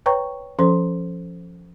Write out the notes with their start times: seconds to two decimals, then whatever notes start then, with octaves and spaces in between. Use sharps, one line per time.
0.06 B4 C#5 G5 A#5 C#6
0.59 F3 C#4 A4 C5 C6